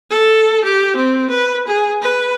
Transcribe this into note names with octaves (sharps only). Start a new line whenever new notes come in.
A4
G4
C4
B4
G#4
B4